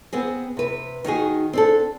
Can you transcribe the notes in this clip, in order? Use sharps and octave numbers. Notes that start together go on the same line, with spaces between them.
B3 C4 G#4
C3 B4
D#3 D#4 F#4 G#4
C4 D4 A4